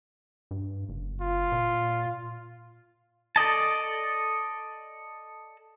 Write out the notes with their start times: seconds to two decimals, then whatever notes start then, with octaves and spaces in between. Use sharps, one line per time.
0.51 G2
0.89 F#1
1.21 F4
1.52 A#2
3.36 A4 D5 D#5 A5